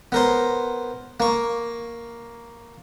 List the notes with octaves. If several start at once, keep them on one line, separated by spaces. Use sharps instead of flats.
B3 A#4 C5
A#3 C#6